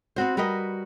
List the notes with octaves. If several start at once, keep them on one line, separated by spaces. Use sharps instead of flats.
B3 C4 F#4 C5
G3 F#4 A#4 B4 D#5